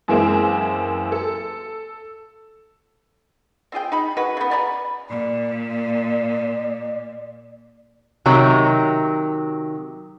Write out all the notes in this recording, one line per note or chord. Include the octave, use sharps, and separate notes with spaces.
F#2 E3 G#3 A#3 C4 E4
A4
C4 F4 G#4 G5
D#4 B5
G#3 F#4 B4 B5
C#3 B3
D5 G#5 A#5 B5
A#2 D5
C3 D#3 F#3